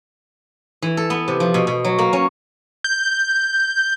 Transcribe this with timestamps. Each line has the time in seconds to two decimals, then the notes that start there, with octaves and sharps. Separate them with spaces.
0.82 E3
0.97 A4
1.10 B3
1.28 C3
1.40 F3
1.54 B2
1.67 B2
1.85 F#3
1.99 A#3
2.13 C#4
2.84 G6